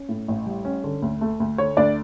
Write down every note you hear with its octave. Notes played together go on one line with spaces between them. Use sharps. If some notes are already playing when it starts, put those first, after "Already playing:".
Already playing: C#4
A2
A1
G3
C#4
D3
D2
A3
D2
D3 C#5
D2 D4 D5